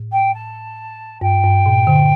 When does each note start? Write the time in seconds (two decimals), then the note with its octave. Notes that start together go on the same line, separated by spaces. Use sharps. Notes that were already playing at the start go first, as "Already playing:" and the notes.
Already playing: A2
0.12 G5
0.34 A5
1.21 G2 G5
1.44 G2
1.66 A#2
1.87 D3